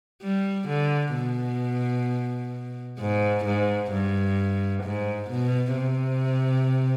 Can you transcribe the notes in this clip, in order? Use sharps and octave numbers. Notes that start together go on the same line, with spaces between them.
G3
D3
B2
G#2
G#2
G2
G#2
B2
C3